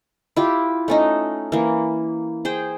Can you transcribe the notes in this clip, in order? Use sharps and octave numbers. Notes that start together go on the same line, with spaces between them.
E4 F4 G4
A3 C#4 D#4
E3 A#3
G#4 C5 G5